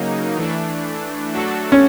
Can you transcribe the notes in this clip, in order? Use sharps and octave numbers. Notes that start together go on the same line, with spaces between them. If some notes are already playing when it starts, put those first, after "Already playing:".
Already playing: C#3 F#3 A#3 D#4
E3 A3 D4
F#3 A3 D4 F#4 A4
C#4